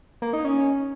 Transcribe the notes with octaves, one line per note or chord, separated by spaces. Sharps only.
A#3
D#4
C#4